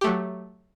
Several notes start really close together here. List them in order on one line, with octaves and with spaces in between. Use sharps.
G4 A3 F#3